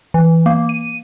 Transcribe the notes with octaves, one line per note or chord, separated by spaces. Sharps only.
E3
A#3
D#7